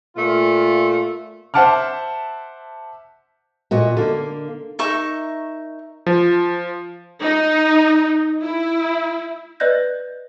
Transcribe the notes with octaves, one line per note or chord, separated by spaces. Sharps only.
A#2 A3 F4
C5 E5 F#5 A5 D6 F6
A#2 F#4 D#5
D3 A#3
D#4 A#4 E5 C#6
F3
D#4
E4
B4 D5 D#5 F#6 G6 A#6